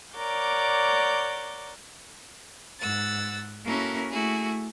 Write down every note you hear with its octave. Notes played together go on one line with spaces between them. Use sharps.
A#4 C#5 D5 F#5 D6 G6
G#2 F#5 E6 A6
A#3 C#4 E4 F#4 A4 A#4
A3 E4 F#4 G#4